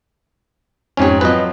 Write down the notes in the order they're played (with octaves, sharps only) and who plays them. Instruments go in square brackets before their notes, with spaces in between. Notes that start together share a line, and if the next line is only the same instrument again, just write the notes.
[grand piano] F2 G#2 G4 [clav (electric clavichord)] C#4 C#5
[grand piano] F3 F#3 C4 [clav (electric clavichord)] B4 D#5